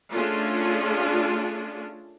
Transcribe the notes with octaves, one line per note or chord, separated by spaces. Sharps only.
A3 C#4 D4 F4 G#4